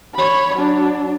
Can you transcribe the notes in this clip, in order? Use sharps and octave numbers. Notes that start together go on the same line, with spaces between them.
C#5 B5
F#3 D4